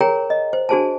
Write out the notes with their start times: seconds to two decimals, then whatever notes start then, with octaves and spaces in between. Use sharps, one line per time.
0.01 G#4 A#4 C#5 G5 A#5
0.30 D#5
0.53 C5
0.69 D4 F#4 G#4 C5 G#5 A5